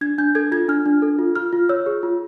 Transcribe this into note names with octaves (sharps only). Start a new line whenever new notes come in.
D4 G#6
D4 G6
A4 G#6
F4 G#6
D4 F6
D4
A4
F4
F4 F6
F4
C#5 E6
G#4
F4